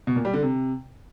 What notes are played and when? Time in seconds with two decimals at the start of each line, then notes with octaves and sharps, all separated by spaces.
0.07 B2
0.16 A#2
0.25 G3
0.34 D3
0.42 C3